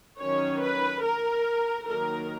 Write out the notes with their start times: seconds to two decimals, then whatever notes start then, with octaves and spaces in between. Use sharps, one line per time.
0.20 D#3 F#3 C#4 C#5
0.62 B4
1.04 A#4
1.87 D#3 F#3 A#3 A#4